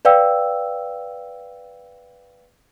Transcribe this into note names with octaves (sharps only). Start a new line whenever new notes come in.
B4 D5 F5 G5 E6